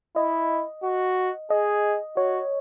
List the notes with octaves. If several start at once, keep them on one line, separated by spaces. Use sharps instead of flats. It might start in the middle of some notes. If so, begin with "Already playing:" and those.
E4 D#5
F#4
G#4 D#5
F#4 C#5